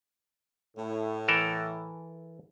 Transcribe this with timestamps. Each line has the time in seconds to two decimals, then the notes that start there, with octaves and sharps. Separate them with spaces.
0.77 A2
1.28 E3 A4 A#4